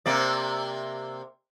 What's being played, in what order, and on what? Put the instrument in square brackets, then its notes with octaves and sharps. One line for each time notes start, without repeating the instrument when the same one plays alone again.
[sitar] C3 A#3 D5